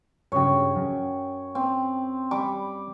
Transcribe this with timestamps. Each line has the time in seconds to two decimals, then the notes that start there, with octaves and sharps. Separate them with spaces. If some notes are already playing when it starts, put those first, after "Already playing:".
0.32 G2 C#3 F#3 C#5 G5
0.76 F#2
1.55 C4
2.31 G3 B5 D6